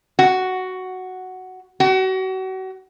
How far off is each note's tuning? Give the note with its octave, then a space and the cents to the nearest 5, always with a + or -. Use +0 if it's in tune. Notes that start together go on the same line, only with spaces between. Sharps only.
F#4 +5
F#4 +35